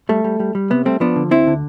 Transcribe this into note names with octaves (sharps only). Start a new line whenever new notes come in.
G3 A3
G3
G3
G3
C3 B3
G3 A3 C4
F3 B3 D4
D3
D2 C4 E4
D3